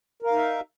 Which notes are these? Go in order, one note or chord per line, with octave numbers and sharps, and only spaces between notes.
D#4 A#4 E5 F5